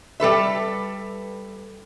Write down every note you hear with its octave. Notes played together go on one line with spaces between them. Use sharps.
G3 A4 B4 E5